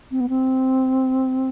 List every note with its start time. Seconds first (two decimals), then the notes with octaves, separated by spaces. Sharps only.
0.11 C4
0.20 B3
0.29 C4